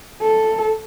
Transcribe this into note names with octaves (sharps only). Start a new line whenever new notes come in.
A4